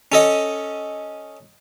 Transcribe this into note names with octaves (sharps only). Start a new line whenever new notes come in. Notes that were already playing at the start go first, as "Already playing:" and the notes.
C#4 A4 D#5